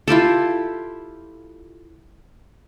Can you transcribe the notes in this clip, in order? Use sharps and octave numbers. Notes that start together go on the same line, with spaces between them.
E4 F4 G4 A4